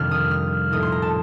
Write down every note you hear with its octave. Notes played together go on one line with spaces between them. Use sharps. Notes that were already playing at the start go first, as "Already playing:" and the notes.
Already playing: F2 C3 D#3 G3 D4 F6
D#6
F6
A#1 A2 A3 D#4 D#6
C6
A#5
A5